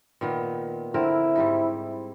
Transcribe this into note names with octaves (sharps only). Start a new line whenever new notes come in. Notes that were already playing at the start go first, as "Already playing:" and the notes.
A#2 D#3 B3
D3 C4 E4 A#4
G#2 G3 D#4